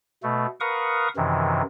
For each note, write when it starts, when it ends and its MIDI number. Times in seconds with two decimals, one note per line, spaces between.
0.23 0.46 47
0.23 0.46 57
0.60 1.08 70
0.60 1.08 71
0.60 1.08 77
0.60 1.08 78
0.60 1.08 85
0.60 1.08 87
1.16 1.62 42
1.16 1.62 48
1.16 1.62 51
1.16 1.62 52